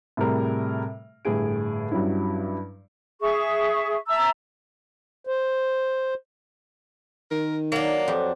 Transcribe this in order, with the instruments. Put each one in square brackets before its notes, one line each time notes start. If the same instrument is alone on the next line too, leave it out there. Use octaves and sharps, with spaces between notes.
[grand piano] A2 C3 G3 G#4 A#4
G1 A2 G4 G#4 D7
G2 F#3 G3 C#4 E4
[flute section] G#4 E5 C#6
E5 A5 A#5 E6
[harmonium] C5
[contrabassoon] D#3 [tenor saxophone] A#4
[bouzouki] F#3 D4 [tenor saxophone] A#3
[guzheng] F2 G4